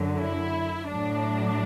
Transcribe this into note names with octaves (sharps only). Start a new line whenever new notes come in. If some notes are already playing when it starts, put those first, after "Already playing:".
Already playing: F#2 D3 F#3
E4
A2 F#3 D4